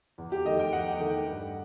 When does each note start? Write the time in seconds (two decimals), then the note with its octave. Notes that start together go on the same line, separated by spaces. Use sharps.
0.18 E2
0.32 G4
0.45 D#3 A3 D#5
0.59 G5
0.72 E2 F#5
1.00 D#3 A3
1.26 G2